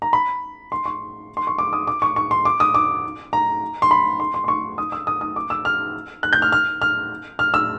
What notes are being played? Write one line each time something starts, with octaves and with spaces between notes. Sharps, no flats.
A#5
B5
C6
C#6
C6
C#6
D6
D#6
D6
C#6
C#6
C6
D6
D#6
D6
A#5
C6
B5
C6
C6
C6
C#6
D#6
E6
D#6
D#6
D6
E6
F6
F#6
G6
F6
F6
F6
F6
E6